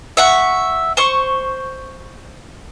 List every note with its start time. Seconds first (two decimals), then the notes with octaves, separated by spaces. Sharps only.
0.17 E5 F#5 C#6
0.97 C5 C#6